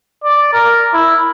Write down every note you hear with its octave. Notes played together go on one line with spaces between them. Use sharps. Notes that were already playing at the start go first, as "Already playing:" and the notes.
D5
A#4
E4